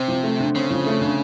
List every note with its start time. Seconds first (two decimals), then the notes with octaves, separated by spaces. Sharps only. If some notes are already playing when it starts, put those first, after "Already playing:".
Already playing: C3 C4
0.08 F3
0.24 A3
0.40 D3
0.55 C#3 C4
0.71 F3
0.86 A3
1.01 D3